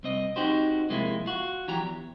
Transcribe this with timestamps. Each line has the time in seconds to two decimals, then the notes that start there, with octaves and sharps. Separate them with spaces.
0.03 C2 C4 D#5
0.36 C4 D#4 F#4 G4 C5
0.89 F2 C3 G#3 A#3 E4
1.26 F4 F#4
1.68 E3 F#3 G4 A#5
1.81 E2